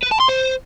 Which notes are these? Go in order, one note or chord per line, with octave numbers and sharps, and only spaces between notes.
B4
A5
C6
C5